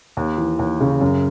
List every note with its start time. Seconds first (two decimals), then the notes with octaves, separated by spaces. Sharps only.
0.17 D#2
0.38 E3
0.59 D#2
0.81 C#3
1.01 F#2